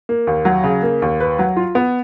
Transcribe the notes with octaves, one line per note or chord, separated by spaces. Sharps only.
A#3
D#2
F#3
C#3
A#3
D#2
B4
F#3
F4
B3